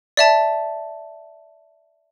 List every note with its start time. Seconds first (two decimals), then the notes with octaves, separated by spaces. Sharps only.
0.17 D5 E5 A5